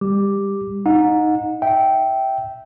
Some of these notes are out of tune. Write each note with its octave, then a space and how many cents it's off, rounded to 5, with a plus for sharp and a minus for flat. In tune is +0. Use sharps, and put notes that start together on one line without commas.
G3 +30 G4 +10 D6 +0
D#4 +0 F#5 -35
E5 -10 G5 -10